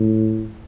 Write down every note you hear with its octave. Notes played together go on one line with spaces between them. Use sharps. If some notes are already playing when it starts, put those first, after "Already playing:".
Already playing: A2